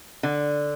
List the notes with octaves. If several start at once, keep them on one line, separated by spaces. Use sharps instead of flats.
D3